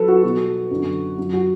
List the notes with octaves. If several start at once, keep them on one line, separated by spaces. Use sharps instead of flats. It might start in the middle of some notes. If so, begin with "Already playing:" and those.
Already playing: F#3 A4 B4
F#4
B2 G3 F#4
F#2 D3 F#3
F#2 F#3
F#4